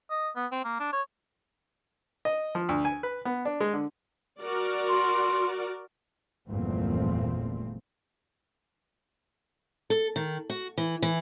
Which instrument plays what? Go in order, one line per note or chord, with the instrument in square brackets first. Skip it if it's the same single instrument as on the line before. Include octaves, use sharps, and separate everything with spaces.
[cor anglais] D#5
B3
C4
A#3
D4
C#5
[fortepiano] D#5
F3
D2
G#5
B4
B3
D4
G#3
D3
[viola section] F#4 A#4 D5
[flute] C6
[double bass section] G1 E2 A#2 F3 A3 C4
[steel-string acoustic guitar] A4
D#3
F#4
E3
E3